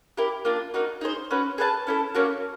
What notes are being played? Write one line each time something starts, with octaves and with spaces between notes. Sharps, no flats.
E4 G4 A#4
A#3 D4 F4
A#3 D#4 F#4
D#4 G#4 C5
C#4 F#4 B4
G#4 B4 E5 A5
C#4 E4 A4
A#3 C#4 F#4